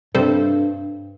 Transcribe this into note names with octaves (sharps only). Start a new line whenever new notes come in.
G2 C3 G3 C4 A4 C5